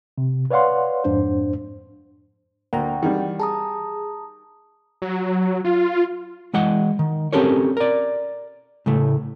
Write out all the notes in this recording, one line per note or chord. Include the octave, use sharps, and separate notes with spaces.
C3
B4 C#5 D5 F5 F#5 C6
F2 G#2 D4 C5
D2 A#3 F#5 G5 A#5
D#3 E3 G3
G#4 A5 A#5 D#6
F#3
F4
E3 G#3 D#5 F#5
D#3
C4 C#4 G4 A4 A#4 C#5
A#4 D5
A2 C#3 A3